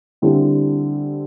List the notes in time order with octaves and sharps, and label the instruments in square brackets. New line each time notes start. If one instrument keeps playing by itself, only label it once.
[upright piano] D3 G3 C4 E4